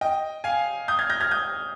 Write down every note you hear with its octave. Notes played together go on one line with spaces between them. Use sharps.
D#5 G5
F5 G#5
D#6 G6
F6 G#6
G6 A#6
F6 G#6
D#6 G6